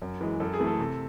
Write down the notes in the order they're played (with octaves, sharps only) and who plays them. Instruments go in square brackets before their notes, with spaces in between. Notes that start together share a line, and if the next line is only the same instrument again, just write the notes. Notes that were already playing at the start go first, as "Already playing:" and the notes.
[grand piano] F#2
E3 G#3
F#2 A4
G#4
E3 A3
A4
C3